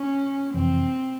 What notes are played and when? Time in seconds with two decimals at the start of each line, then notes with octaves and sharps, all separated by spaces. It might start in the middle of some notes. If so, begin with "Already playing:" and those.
Already playing: C#4
0.54 F2 C3 E3 C4